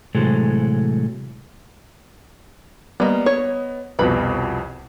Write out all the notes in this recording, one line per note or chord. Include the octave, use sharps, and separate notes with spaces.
A2 C3 E3 F#3 G#3 A4
G3 A#3 B3 D#5
C#5
C2 F2 B2 B4 B5